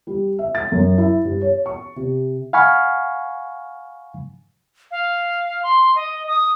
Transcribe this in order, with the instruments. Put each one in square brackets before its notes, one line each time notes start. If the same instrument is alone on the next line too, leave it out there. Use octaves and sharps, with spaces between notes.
[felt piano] G3
E5
A6
F#2
E4
G2
C#5
C#6
C3
[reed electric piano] F5 F#5 G#5 B5 C#6 F6
[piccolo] F5
C6
D#5
D#6